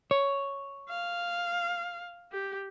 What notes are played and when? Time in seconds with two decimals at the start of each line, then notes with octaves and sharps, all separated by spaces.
0.11 C#5
0.89 F5
2.32 G4